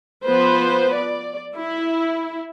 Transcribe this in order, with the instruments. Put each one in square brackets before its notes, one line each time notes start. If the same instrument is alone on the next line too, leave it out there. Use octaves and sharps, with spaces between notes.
[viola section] F3 B3 B4 C5
D5
E4